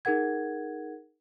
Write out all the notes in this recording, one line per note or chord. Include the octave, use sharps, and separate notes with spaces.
D#4 G#4 A#4 F#5 G#6